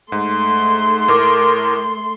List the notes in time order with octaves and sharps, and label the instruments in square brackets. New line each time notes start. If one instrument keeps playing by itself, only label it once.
[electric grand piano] G#2 [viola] A3 C6
[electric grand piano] A2 A#4 D6